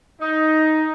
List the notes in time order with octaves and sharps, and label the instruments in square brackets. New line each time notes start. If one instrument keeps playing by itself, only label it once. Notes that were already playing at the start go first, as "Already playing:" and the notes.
[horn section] D#4